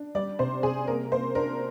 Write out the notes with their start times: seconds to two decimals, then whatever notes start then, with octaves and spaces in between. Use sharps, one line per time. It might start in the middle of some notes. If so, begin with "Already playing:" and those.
Already playing: D4
0.15 G3 D5
0.39 C3 C5
0.63 C3 G#4
0.87 A#3 A#4
1.12 A#3 C5
1.35 D4 A#4